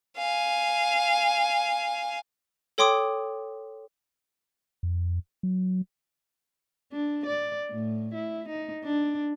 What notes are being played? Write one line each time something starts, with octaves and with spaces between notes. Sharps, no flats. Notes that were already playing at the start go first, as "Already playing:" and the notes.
F5 G#5
A4 C#5 G5 C6 D6 D#6
F2
F#3
D4
D5
A2
E4
D#4
D4